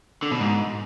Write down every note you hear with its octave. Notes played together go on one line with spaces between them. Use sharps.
D3
B2
G#2